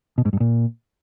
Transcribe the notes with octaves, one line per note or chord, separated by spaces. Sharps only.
B2
G#2
G2
A#2